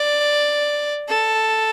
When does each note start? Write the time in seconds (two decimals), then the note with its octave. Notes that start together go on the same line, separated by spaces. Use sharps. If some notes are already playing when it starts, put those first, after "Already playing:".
Already playing: D5
1.09 A4